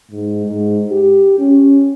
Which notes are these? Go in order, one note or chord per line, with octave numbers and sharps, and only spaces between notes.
G#2
G#2
G4
C#4